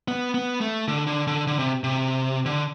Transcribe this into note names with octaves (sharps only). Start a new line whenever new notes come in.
B3
B3
A3
D3
D3
D3
D3
C3
C3
D3